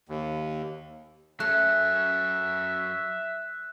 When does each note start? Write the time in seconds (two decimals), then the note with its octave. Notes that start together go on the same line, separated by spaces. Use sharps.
0.09 D#2
1.40 F#3 A3 C#4 E5 F#6